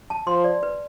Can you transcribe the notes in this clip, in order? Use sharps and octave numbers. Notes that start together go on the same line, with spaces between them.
A5
F3 C6
D5
B4